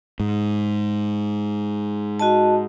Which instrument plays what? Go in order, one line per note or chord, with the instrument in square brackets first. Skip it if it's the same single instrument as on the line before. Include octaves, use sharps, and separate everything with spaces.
[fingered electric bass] G#2
[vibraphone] F#4 D#5 A5